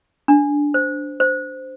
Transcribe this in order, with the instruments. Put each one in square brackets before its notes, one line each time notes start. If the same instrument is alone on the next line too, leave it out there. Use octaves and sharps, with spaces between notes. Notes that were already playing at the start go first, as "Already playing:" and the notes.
[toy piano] D4
C5
C5